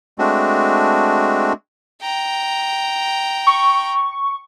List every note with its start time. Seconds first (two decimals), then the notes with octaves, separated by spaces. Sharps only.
0.19 G#3 A3 C4 D4 F#4
2.02 G5 A#5
3.47 C#6